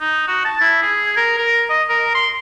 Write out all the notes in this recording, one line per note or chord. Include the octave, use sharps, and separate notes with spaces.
D#4
F#4
A5
E4
G#4
A#4
A#4
D#5
A#4
C6